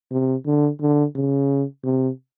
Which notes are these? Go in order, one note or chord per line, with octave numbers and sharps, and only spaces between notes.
C3
D3
D3
C#3
C3